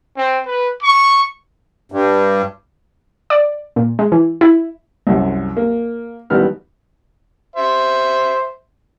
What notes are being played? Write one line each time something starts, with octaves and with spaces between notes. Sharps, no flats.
C4
B4
C#6
G2
D5
A#2
G#3
E3
E4
C2 F#2
A#3
A1 D#3 G3 B3 F6
C5 E5